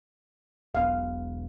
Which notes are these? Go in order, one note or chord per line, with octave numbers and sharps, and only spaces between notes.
E1 B1 B3 F5